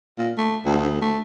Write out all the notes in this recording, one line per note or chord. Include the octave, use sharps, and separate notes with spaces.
A#2
A3
D2
A3